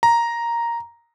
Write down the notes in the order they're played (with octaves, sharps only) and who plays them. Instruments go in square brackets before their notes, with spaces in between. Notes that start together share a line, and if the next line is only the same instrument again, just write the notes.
[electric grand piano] A#5